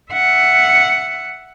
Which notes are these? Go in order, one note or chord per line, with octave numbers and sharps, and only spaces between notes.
E5 F#5